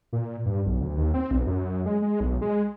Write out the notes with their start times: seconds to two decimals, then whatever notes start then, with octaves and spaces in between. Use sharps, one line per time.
0.13 A#2
0.46 G2
0.66 B1
0.81 D2
0.97 D#2
1.14 C4
1.31 B1
1.47 F#2
1.86 G#3
2.02 G#3
2.20 B1
2.41 G#3